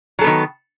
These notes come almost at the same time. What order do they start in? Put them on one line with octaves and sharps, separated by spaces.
F#3 A4 B3 D#3